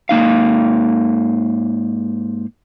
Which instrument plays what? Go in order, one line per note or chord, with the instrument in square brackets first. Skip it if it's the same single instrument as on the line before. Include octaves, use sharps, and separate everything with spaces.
[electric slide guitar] G#2 A#3 D#4 F5